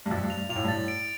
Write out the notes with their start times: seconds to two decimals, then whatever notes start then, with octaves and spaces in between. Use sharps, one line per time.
0.06 G2
0.11 F2 A6
0.24 G2
0.30 F7
0.37 G2
0.49 A#2 F7
0.56 A2
0.64 G2
0.68 A2 A6
0.88 D7